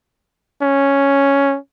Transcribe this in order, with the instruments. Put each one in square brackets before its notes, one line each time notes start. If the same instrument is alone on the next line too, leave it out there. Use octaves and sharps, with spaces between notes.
[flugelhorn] C#4